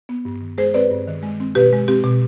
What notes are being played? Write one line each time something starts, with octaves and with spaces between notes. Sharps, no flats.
B3
G2
D#3
G#3 G#4 C5
C4 B4 D5
G2
D#3
G#3
C4
B2 G4 B4
G#3
C4 G4
B2